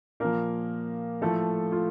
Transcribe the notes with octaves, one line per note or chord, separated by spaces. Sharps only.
A#2 F3 A#3 A#4
A2 F3 A3 A4
F4